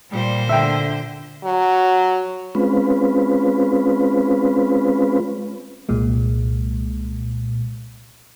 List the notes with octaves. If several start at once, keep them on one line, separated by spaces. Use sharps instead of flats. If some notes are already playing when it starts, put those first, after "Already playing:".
A#2 G3 C5
D3 E5 G5
F#3
G#3 C4 C#4 F4 B4
C2 A#2 G#3